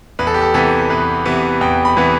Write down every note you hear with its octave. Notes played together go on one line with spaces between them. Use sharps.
E2 B4
A4
G4
A4
C3 E3 B3 A4
E2 B4
C3 E3 B3
E2 G5
B5
C3 E3 B3